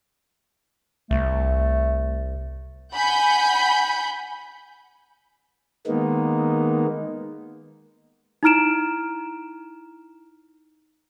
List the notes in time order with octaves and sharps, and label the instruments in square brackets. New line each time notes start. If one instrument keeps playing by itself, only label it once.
[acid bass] C2 [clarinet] A3
[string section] F#5 G#5 B5 G6
[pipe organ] D#3 G#3 A#3 B3 D#4
[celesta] D#4 E4 A#5 F6 D7 E7